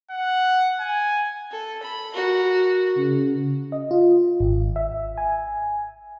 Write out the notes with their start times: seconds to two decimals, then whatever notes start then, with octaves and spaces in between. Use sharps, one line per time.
0.11 F#5
0.80 G#5
1.52 A4
1.83 B5
2.14 F#4 A#4
2.97 C#3
3.72 D#5
3.91 F4
4.40 G#1
4.76 E5
5.18 G#5